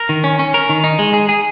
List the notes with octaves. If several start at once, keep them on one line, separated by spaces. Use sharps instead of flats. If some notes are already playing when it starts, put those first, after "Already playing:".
Already playing: A#4
D#3
C#4
C#4
A#4
D#3
D#4
G#3
G#4
G#4